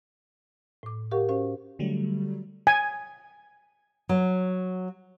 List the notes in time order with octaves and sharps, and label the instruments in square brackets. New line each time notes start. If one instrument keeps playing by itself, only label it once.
[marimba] A2 D6
G4 A#4 F5 F#5 C#6
C#4 F#4 C5 F5
[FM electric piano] D3 F#3 G3 A3
[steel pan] G#5
[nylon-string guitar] F#3